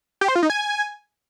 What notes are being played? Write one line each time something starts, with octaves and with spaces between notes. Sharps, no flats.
G4
C5
F4
D#4
G#5